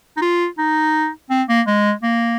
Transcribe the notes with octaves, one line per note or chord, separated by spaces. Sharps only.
D#4
F4
D#4
C4
A#3
G#3
A#3